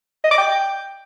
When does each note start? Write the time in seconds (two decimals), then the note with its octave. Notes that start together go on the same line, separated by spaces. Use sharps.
0.24 D#5
0.31 D6
0.38 G5